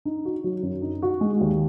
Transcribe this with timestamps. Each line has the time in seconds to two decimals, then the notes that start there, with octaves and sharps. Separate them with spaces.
0.05 D#4
0.25 F#4
0.44 F#3
0.63 F#2
0.82 D#4
1.02 F#4
1.21 G#3
1.40 D#2